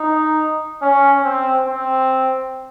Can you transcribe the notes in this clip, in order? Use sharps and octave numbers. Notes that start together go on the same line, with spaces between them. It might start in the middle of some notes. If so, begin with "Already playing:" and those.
Already playing: D#4
C#4
C4
C4